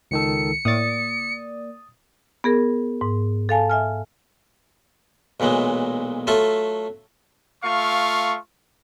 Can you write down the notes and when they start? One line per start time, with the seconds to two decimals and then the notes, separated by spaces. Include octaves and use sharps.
0.11 C#2 D#3 A4 C#7
0.65 A2 A#3 D5 D#6 A6
2.44 B3 G#4 A#4
3.01 G#2
3.49 A4 F5 G#5 A5
3.69 E5 G#5 F6
5.40 B1 A#2 E3 F#3 G#3
6.27 F#3 A3 F4 A4 E5
7.64 A3 F4 F5 C#6